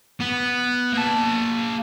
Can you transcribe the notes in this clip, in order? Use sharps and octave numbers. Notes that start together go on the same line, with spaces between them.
B3
A#3 A5